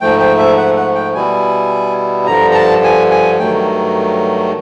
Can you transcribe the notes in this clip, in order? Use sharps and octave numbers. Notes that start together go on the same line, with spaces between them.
G#2 F3 A3 G5
G5
E5
F#5
F#5
G5
B2 G3 B3 E4 G#5
G2 D3 F3 A#5
A#5
A5
G#5
G#5
G2 D#3 F#3 A3 G5